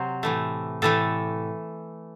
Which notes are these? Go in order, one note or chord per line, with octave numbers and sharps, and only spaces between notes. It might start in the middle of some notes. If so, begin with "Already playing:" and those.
Already playing: C3 F#3 C5
A2 E3 A3
A2 E3 A3 A4